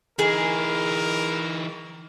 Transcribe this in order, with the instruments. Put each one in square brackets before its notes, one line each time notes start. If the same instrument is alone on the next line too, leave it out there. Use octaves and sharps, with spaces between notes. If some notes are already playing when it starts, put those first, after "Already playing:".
[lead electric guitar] E3 D#4 [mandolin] G#4 [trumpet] A#4